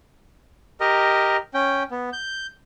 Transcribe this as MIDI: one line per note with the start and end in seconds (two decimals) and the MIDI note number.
0.80 1.37 67
0.80 1.37 70
0.80 1.37 75
1.54 1.83 61
1.54 1.83 79
1.91 2.10 59
2.13 2.47 91